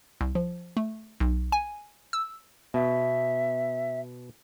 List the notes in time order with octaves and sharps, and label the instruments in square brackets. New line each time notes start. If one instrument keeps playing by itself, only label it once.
[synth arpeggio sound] C2
F3
A3
B1
G#5
E6
[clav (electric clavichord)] B2 [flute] E5